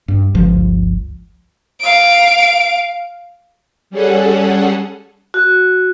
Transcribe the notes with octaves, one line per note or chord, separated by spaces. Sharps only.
G2
G1 C#2 F3
F5 D7
G3 C#4 G#4 A4 F#5
F#4